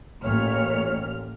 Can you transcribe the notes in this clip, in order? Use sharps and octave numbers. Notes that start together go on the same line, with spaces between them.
A1 A#2 C#5 F6